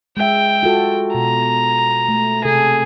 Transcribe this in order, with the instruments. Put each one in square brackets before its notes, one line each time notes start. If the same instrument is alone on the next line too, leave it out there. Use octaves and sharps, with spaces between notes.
[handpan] G#3 E5 [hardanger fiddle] G5
[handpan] F4 F#4 A4
[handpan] B2 [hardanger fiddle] A#5
[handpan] A3
[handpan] C3 A4 [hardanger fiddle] G#4